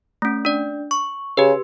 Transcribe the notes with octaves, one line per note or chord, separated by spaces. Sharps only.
A3 C#4
D4 D5
C#6
C#3 G4 B4